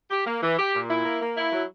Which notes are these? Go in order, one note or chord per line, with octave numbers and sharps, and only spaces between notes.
G4
A#3
E3
G4
A#2
E4
A#3
A#3
E4
F#3